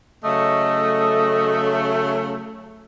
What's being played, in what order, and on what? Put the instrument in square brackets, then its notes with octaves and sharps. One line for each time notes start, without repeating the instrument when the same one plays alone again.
[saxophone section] C#3 F#3 A3 [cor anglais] D#5